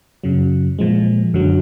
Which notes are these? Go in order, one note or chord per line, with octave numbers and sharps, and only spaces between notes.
F#2 C#3 F#3
A#2 F3 G#3
F#2 D3 F#3